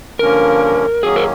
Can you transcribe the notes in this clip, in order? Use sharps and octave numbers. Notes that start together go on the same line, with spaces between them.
G2 D3 F3 A#3 C#4 A#4
F#2 D#3 F#3 A#3 C#4 G#4
A#4